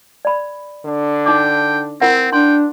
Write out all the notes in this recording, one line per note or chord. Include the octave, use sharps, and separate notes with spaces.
D5 B5
D3 D4
D#4 G5 D6
C4 E4 A#4 F#5
D4 G5 C6